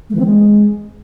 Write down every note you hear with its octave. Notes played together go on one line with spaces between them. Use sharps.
A3
E3
C4
G#3